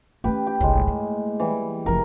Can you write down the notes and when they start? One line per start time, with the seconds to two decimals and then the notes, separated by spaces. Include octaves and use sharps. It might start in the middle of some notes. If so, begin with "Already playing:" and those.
0.24 A3 C#4 G4 B4
0.47 G4
0.61 G1 C2 A2 G#3
0.88 A#3
1.40 E3 G3
1.86 F#1 F3 A#4